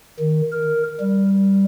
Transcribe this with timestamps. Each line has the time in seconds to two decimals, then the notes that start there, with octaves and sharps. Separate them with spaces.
0.20 D#3
0.52 A#4
1.01 G3